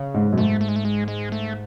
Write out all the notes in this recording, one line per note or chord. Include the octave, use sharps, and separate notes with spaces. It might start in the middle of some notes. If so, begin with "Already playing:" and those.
Already playing: C#3
G#2
F#2
G#2 A3
A3
G#3
A3
G#3
G#3
A3